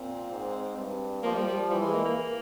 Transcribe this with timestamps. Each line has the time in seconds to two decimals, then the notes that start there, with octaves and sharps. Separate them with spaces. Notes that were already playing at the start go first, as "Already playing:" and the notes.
Already playing: A#2 C4
0.31 G#2
0.77 G2
1.23 F3 A#3
1.35 G3
1.47 G3
1.70 E3 G3
1.82 G#3
1.93 A#3
2.05 A#3